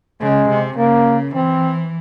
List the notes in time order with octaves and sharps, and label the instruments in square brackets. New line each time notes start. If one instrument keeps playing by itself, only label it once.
[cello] C#3 [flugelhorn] G#3
[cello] C3
[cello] C#3 [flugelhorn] A#3
[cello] E3 [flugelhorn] C4